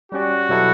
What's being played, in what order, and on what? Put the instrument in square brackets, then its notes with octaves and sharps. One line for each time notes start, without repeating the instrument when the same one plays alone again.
[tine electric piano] G3 C#4 G4 D5 [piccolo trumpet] F#4
[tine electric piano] B2 F#3 B3 E4 A4